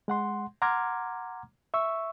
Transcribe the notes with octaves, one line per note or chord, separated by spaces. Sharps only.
G#3 F#5 C6
F#5 A#5 C6 D6 F6 G#6
E5 C#6 E6